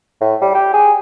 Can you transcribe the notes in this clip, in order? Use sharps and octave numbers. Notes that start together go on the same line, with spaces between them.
A2
G3
G4
G#4